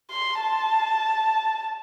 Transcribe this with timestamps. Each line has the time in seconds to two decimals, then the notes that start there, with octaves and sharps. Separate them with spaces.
0.11 C6
0.41 A5